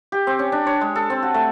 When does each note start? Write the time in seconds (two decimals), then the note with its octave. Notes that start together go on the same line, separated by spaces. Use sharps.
0.12 G4
0.27 C4
0.39 C#4
0.52 D4
0.67 C#5
0.81 G#3
0.95 A4
1.10 C4
1.23 F#4
1.34 A3